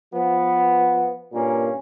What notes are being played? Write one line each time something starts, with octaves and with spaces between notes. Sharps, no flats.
F3 B3
G2 A#2 A#3 C#4